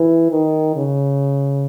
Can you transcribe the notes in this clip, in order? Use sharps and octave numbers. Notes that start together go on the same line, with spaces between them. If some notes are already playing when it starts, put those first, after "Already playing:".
Already playing: E3
D#3
C#3